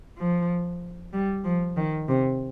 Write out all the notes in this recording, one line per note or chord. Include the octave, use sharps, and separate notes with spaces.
F3
G3
F3
D#3
C3